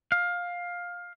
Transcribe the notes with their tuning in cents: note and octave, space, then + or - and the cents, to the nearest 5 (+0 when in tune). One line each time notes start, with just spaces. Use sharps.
F5 +15